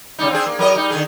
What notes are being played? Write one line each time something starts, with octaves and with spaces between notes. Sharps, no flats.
C#3 G3 D#4
C4 D4 G#4
A#3
F#3 A#4 D#5
G3 D#4
D3 D#3 G#4